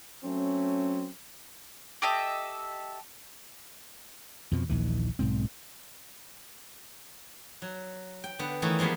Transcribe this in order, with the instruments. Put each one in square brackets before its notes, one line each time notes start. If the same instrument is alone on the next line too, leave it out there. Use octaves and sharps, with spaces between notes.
[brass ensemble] F#3 A3 C4 C#4
[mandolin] G4 A4 D#5 E5
[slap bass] F2 B2 F3
A#1 D#2 E3
B1 G#2 C4
[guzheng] F#3
G5
D3 B3
D#3 E3 A3 C#4 D#4
F3 G#3 A#3 B3 G4